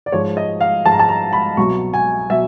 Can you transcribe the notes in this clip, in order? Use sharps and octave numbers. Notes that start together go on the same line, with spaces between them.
D5
G#2 F3 G#3 C#5
D#5
F5
G#2 F3 G#3 A5
A#5
A5
A#5
B5
C2 B2 F#3 C#6
G#5
B2 F#3 E5